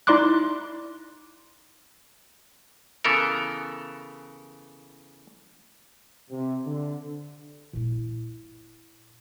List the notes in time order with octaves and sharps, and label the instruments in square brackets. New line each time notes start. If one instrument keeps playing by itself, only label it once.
[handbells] D#4 E4 D5 C6 D6 F#6
[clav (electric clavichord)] C#3 E3 B3 A4 A#4
[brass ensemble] C3
D3
[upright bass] A#2 E4